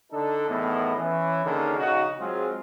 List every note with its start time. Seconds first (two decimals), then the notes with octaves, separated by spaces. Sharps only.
0.11 D3 D4 D#4 A4
0.48 E2 A2 D#3 B3
0.96 E3 C#4
1.45 D3 D#3 A#3 C#4 D#4 G#4
1.78 A#1 C#3 D#4 F#4
2.18 F#3 G#3 C4 F4 G#4